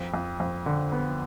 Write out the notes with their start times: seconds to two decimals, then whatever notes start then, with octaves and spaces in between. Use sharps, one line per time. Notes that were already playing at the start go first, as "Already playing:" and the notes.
Already playing: F2
0.14 F2
0.40 F2
0.66 D3
0.92 B3